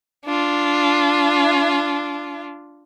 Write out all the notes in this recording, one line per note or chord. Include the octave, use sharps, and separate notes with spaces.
D4 F4